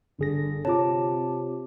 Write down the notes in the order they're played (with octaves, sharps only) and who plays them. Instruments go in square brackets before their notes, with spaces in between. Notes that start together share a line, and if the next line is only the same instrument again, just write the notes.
[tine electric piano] G1 G#4 A#6 [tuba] D3
[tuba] C3 [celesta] F4 C#5 [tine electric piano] A5 D6